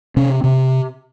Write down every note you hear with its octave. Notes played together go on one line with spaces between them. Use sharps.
C3 C#4
C3